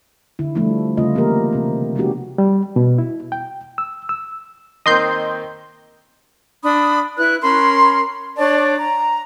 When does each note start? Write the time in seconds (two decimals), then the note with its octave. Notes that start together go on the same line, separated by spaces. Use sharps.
0.39 D3 E4
0.55 F3 G3 A3 D4 E4
0.97 C#3 G3 A3 C4 F4 D#5
1.15 E3 A#3 B3 G4 A#4
1.53 C3 C4
1.95 F3 G#3 B3 D4 F#4 G4
2.38 G3
2.76 B2
2.98 E4
3.32 G5
3.78 E6
4.09 E6
4.86 D#3 A#3 C4 D#5 C6 G6
6.63 D4 B5 D#6
7.17 E4 B4 F#6
7.42 C#4 A#4 B5 C6
8.37 D4 C#5 D5 A5
8.78 A#5